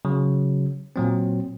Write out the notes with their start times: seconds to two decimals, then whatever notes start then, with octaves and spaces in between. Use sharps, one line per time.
0.05 C#3 F#3
0.96 A#2 F#3 C4